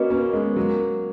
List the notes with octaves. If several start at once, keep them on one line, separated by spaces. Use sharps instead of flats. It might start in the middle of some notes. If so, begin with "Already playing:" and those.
Already playing: A#3 C#4 F#4 B4 D#5
A#3 C#4
G#3 B3
F#3 A#3